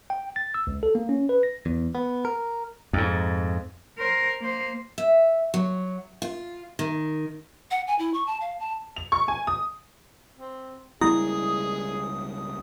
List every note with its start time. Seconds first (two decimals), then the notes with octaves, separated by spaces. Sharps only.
0.10 G5
0.36 A6
0.54 E6
0.67 C#2
0.83 A4
0.95 A#3
1.09 C#4
1.29 B4
1.43 A#6
1.66 E2
1.95 B3
2.25 A#4
2.93 F2 G#2
3.99 A#4 C5
4.41 A#3 C5
4.98 E5
5.54 F#3
6.22 F4
6.79 D#3
7.71 F#5
7.87 G#5
7.99 E4
8.14 C#6
8.27 A5
8.41 F5
8.60 A5
8.96 F7
9.12 C#6
9.28 G#5
9.47 D#6
10.38 C4
11.01 C#2 G3 A#3 E4 G#4 D#6